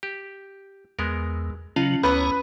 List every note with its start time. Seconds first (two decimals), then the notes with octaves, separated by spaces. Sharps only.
0.03 G4
0.99 E2 G#3 B3 A#4
1.76 C#3 F#3 C#4 F4 D#5 F5
2.03 D2 E3 B3 B4 C#5 A#5